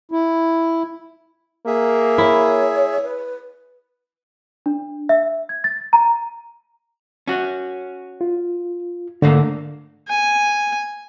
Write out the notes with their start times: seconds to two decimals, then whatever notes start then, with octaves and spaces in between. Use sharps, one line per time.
0.11 E4
1.67 A#3 G#4 E5
2.18 E4 C#5
3.03 B4
4.66 D4
5.09 E5
5.49 G#6
5.64 A6
5.93 A#5
7.28 C#4 F#4
8.21 F4
9.22 G#2 D3 A3 A#3
10.08 G#5